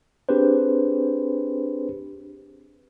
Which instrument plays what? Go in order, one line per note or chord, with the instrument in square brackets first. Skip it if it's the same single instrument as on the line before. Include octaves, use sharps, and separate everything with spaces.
[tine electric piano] C4 D4 G4 G#4 B4 C5